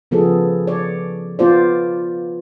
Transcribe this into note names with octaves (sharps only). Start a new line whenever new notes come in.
C#3 F3 B3 G#4 A4
C#5 D5
B3 F4 C5 D5